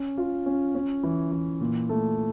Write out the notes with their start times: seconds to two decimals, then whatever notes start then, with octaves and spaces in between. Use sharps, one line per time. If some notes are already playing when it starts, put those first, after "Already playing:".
Already playing: C#4
0.17 F4
0.46 C#4
0.75 C#4
1.03 E3
1.32 E3
1.61 A#2
1.89 A3